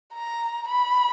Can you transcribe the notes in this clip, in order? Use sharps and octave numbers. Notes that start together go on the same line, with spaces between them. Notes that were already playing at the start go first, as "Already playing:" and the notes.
A#5
B5